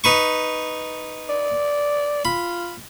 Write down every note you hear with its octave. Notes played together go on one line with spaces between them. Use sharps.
D#4 B4 C#6
D5
F4 B5